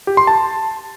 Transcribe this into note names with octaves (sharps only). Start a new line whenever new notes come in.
G4
C6
A5